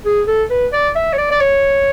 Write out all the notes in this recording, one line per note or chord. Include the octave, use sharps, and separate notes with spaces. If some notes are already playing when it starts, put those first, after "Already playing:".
G#4
A4
B4
D5
E5
C#5
D5
D5
C#5